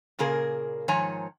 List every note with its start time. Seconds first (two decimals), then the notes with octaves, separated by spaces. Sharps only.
0.19 A#2 C#3 A#3 G#4 A#4
0.88 G#2 D#3 F3 C#5 G#5 A#5